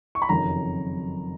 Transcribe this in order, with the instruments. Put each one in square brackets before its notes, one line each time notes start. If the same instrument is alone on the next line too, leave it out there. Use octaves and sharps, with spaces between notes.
[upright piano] C#6
B5
F#1 F2 D#3 F#3 A#5